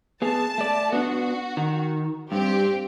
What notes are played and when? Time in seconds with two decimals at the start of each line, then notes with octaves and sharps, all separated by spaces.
0.22 B3 G#4 A5
0.58 A3 D5
0.93 B3 D4 F#4
1.57 D#3
2.32 G2 C4 G4